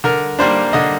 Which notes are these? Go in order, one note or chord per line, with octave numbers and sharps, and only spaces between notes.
D3 A#4
G3 A#3 D4 C5
D3 D#5